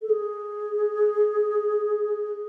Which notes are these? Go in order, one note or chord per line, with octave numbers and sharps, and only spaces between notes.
A4
G#4